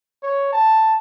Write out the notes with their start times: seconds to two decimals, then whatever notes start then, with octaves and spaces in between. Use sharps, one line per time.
0.23 C#5
0.53 A5